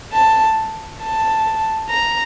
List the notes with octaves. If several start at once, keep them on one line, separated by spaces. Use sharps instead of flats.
A5
A5
A#5